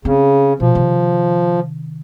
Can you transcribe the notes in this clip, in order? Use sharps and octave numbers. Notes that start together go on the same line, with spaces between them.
C#3 C4
B2 F3
C3 D#3